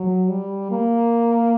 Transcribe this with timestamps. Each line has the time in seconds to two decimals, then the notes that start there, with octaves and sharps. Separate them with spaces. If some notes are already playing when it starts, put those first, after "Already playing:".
Already playing: F#3
0.29 G3
0.71 A#3